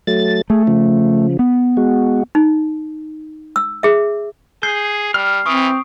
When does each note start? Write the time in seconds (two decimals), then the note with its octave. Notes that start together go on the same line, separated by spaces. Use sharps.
0.07 F#3 A3 A6
0.50 A3 G#4
0.67 C#3 F3
1.39 B3
1.77 G#3 F#4
2.35 D#4
3.56 E6
3.83 G#4 E5
4.63 G#4 G6 C7
5.14 G3 F6
5.46 E3 C4 C#6 D#6 D7